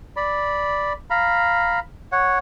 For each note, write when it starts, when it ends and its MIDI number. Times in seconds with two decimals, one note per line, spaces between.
0.16 0.93 74
0.16 0.93 83
1.10 1.79 77
1.10 1.79 82
1.10 1.79 83
2.12 2.39 73
2.12 2.39 78